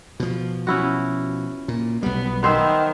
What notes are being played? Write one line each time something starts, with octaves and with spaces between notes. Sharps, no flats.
B2 F3
C#4 E4 F#4
A#2
B1 G3 B3
D#3 B3 C5 E5